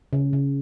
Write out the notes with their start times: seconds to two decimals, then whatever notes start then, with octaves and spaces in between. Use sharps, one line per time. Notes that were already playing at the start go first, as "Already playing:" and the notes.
0.13 C#3
0.33 C#3